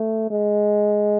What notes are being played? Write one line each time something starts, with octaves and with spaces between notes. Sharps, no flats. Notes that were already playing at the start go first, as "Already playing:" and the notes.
Already playing: A3
G#3